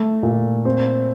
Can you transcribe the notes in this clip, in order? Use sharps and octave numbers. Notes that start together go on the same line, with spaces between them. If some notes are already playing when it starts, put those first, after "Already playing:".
Already playing: A3
A#2
C4